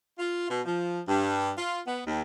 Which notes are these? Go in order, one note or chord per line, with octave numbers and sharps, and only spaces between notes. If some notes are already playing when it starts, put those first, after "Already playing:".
F4
B2
F3
G2
F4
B3
D#2